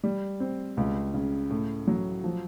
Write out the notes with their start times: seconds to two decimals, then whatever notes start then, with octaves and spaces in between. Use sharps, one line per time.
0.04 G3
0.40 C4
0.77 C#2
1.14 C#3
1.50 A2
1.88 F#3
2.24 F3